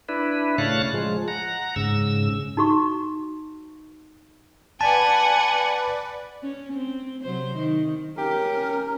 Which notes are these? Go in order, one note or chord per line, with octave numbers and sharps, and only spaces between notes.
D4 E4 B4
A2 C#3 C#5 F5 A5 F#6
F3 G#3
F#5 A#5
G#2 C#3 E6
D#4 F#4 C#6
B4 D5 F#5 G#5 A5
C#4
C4
C3 F#3 C5
D#3
C#4 G4 A#4